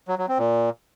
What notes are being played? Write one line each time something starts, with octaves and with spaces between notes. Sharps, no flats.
F#3
F#3
C4
A#2